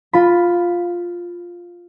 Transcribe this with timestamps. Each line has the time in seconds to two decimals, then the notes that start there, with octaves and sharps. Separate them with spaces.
0.13 F4 B5